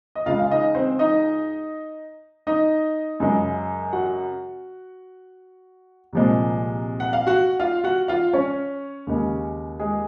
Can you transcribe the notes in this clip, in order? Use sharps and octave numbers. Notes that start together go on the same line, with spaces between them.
D#5
C#2 C#3 G#3 F4 F5
F5
D#4 D#5
C4 C5
D#4 D#5
D#4 D#5
F#2 C#3 G#3
F#4 F#5
C2 A#2 F3 G#3
F#5
F5
F#4 F#5
F4 F5
F#4 F#5
F4 F5
C#4 C#5
D#2 C#3 G#3
G#3 G#4